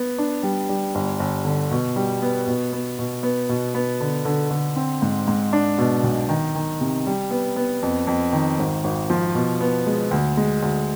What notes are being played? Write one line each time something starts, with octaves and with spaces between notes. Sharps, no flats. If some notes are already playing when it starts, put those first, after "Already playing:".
Already playing: B3
D4
G3
G3
G1
G1
D3
B2
G3
B3
B2
B3
B2
B3
B2
B3
D3
D3
D3
C4
G#2
G#2
D4
B2
B1
D#3
D#3
C3
G3
B3
B3
F2
F2
D#3
G#1
G#1
F3
B2
B3
G#3
D2
G#3
D2